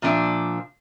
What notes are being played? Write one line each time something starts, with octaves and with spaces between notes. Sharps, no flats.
A#2 F3 D4 E5